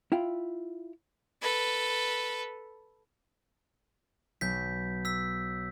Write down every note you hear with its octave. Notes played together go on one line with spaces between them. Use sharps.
E4 F4 G5
A4 B4
B1 G6 B6
E6 B6